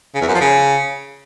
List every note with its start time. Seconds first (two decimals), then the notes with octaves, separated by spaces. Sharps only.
0.15 C#3
0.21 E2
0.28 F#2
0.34 F3
0.41 C#3